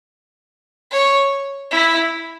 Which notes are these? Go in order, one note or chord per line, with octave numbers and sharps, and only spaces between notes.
C#5
E4